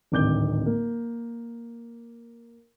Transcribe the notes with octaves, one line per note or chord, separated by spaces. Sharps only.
D1 G#1 D6 G6 G7
A#3